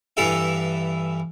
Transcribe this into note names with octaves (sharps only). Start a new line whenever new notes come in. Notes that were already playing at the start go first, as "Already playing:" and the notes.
G2 E3 E4 A4 F5